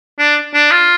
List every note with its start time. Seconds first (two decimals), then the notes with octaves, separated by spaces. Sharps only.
0.19 D4
0.54 D4
0.71 F4